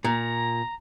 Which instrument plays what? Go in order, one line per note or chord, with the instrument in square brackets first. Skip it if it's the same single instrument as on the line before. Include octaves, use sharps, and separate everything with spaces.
[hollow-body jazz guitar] A#2 [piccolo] A#5